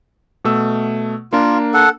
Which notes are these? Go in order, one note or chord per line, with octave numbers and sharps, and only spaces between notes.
B2 A3 E6
A#3 D4 F4 A#4
A4 F#5